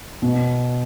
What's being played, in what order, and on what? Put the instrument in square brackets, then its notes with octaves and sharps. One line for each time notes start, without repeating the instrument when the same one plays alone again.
[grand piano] B2